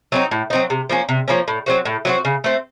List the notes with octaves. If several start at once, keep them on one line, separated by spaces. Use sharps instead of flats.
F#3 C4 D#4
A2
F#3 C4 D#4
C3
F3 A#3 C#4
C3
F3 A#3 C#4
A2
F#3 C4 F#4
A2
F#3 C4 F#4
C#3
A3 C4